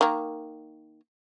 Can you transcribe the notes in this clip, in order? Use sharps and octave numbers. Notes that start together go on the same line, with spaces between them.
D#3 A#3